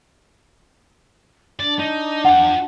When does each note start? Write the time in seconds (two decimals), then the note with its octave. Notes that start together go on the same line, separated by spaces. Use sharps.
1.60 D4 D5
1.79 D#4
2.25 F4 F#5 G5